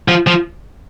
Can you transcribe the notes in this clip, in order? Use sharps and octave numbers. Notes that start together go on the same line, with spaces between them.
F3
F3